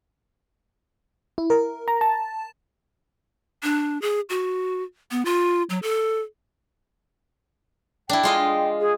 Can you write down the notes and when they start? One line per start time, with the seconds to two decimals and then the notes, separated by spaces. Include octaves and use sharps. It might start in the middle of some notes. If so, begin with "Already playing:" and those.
1.38 E4
1.50 A#4
1.88 A#5
2.01 A5
3.63 D4
4.02 G#4
4.30 F#4
5.11 B3
5.25 F4
5.70 F#3
5.83 A4
8.09 D4 E4 G5
8.23 G#3 F4 D#5
8.80 G#4